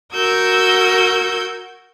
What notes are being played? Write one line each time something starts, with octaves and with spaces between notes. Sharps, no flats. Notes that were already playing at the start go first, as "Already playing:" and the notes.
F#4 A#4 E6 G6 G#6